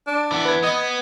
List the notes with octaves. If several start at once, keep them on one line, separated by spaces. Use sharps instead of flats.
D4
E3 B3
B4 G#6
B3 D#5